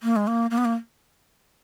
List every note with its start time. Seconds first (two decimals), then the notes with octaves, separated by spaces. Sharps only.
0.03 A#3
0.16 G#3
0.27 A#3
0.51 A#3
0.58 B3
0.65 A#3